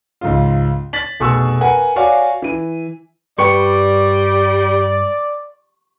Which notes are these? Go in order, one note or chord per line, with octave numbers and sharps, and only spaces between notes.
C#2 G#2 F4
A6 B6 F#7
F1 B2 G#4 C#6 E6
A#4 B4 F#5 G#5
F#4 C#5 D5 F5 G#5
E3 D#7
G2 G3 B4 D5 G5 C#6